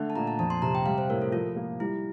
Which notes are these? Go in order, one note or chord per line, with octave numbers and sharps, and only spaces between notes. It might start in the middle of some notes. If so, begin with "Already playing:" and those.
Already playing: D3 A3
A5
A#2 A#5
A5
F2 A5
C6
C3 A#5
G5
G3 F5
C5
A2 A#4
A4
F3 F4
A#3
G3 E4